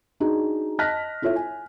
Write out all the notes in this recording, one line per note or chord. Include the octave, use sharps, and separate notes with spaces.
D4 D#4 F#4 G#4
D#5 A5 F6 F#6 A#6 B6
E4 F4 A4 C#5 E5
G#5